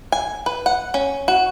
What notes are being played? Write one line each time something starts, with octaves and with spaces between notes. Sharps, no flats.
G#5
B4
F#5
C#4
F#4